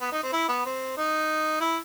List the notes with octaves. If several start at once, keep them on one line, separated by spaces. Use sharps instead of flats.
B3
D#4
C4
E4
B3
C4
D#4
E4